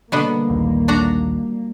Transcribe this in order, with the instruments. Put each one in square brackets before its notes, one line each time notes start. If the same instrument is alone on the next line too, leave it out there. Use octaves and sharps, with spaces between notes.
[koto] B2 D3 B3 [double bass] G3 A#3
[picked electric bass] A#1 D#2
[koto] D4 F#4 A#5